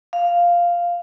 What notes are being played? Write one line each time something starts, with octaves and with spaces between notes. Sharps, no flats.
F5